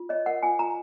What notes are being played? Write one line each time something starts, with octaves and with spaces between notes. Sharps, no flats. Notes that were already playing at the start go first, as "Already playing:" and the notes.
Already playing: F4
C#5 D#5
A#4 F#5
F4 G#5
F4 A#5